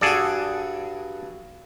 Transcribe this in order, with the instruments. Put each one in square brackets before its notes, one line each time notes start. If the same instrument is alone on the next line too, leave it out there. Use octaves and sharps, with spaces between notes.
[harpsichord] G2 F#4 [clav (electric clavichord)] G#4 A4 D5